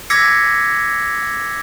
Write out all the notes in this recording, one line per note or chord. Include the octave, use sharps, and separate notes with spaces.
D6 E6 G#6 A#6 B6 C#7